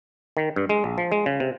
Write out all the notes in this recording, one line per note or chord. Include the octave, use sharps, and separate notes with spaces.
D#3
G2
G#3
A#1
F3
G#3
C#3
C3